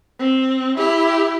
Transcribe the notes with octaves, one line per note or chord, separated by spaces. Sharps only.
C4
E4 G4